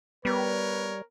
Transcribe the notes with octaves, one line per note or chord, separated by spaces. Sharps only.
G3 B3 A#4 B4 C#5